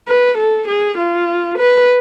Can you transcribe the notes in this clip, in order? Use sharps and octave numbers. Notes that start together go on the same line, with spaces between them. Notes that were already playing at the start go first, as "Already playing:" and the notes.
B4
A4
G#4
F4
B4